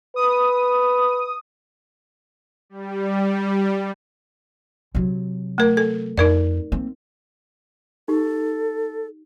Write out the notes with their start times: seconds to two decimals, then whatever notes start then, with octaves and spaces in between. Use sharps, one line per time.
0.16 B4 D#6
2.70 G3
4.95 C3 F#3
5.58 A3 A#4
5.77 A4
6.18 F2 D#4 A#4 D5
6.72 A#3 C4
8.08 D#4 G4 A4